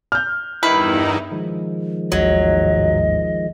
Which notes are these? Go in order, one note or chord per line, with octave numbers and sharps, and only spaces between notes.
F6 G6
E2 G2 D#3 D#4 E4 B4
D#3 F3 G#3
A1 D#2 G#2 F#3 D#5